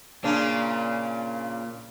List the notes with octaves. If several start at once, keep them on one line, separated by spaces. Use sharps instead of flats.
A#2 C#3 C#4 D4